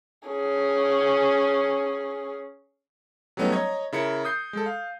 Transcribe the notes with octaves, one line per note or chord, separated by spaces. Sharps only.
C#4 G#4
F#3 G3 A3 B3 C#4 D#4
C#5 D#5 A#5 G#6
C#3 E4 A#4 C#7
D#6 G6 C7
G#3 A4
F5